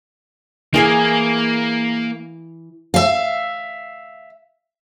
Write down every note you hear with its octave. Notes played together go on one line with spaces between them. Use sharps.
E3 A#3 G#4 G#5
E5 F5